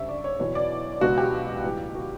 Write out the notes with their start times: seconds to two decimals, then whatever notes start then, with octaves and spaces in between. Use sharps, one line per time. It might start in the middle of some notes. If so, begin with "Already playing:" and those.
Already playing: D2 C#3 G3 E5 C#6
0.08 D5
0.24 C#5
0.39 E2 B2 F#3 C#5
0.55 D5
1.01 C#2 B2 F#3 F#4
1.18 G4
1.63 A2 E3 G3
1.95 F#4